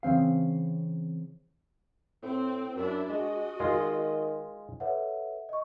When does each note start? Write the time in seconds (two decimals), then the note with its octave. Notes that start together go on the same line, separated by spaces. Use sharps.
0.03 C#3 E3 C4 F5
2.23 A2 C4
2.76 F#2 D4 E4 E5
3.09 G#3 F#4 D#5
3.60 D#3 G#3 F4
4.80 A4 B4 C#5 E5 F#5
5.49 D#5 C#6